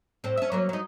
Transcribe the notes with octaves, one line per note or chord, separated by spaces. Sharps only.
A2 C4
C#4 E5
F#3 A#3 C#4
F#3 D#4